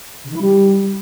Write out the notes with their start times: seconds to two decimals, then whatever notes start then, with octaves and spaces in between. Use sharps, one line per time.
0.24 C#3
0.30 D#3
0.35 E4
0.41 G3